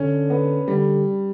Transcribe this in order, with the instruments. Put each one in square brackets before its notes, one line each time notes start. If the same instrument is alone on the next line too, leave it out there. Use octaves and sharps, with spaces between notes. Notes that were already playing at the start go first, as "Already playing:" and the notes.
Already playing: [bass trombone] D3 [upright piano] C#4
[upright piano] B3
[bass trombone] D3 [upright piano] G3